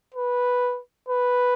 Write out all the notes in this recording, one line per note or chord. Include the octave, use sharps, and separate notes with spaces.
B4
B4